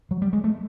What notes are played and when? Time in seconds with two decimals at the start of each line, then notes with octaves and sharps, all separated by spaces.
0.11 F#3
0.22 G3
0.33 G#3
0.44 A3